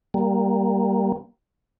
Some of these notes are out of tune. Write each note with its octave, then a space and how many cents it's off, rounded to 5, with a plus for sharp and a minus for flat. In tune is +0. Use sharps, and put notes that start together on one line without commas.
G3 -5 A#3 +0